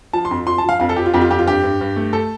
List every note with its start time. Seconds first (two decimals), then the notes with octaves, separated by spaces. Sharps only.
0.13 F3 A5
0.25 C6
0.31 F2
0.46 F3 C6
0.58 A5
0.64 F3 F5
0.80 F2 F5
0.89 A4
0.96 F3 G4
1.06 F4
1.14 F2 G4
1.21 F4
1.30 F2 G4
1.39 F4
1.46 G2 G4
1.64 G2
1.81 G2
1.96 A3
2.13 A4